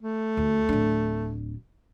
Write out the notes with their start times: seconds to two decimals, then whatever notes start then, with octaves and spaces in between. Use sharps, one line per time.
0.02 A3
0.37 D2
0.69 D1 D4